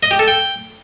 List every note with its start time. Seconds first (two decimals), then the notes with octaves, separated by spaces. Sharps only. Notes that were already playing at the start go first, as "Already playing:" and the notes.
0.03 D#5
0.11 G4
0.19 A4
0.28 G5